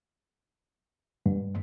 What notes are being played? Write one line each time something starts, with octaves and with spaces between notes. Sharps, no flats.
G2